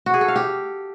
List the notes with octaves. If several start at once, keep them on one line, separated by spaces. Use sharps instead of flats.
F#4
G#4
A4
F5
G4